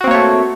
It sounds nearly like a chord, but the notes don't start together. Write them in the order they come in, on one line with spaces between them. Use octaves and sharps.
F#4 C4 A#3 C#5 A3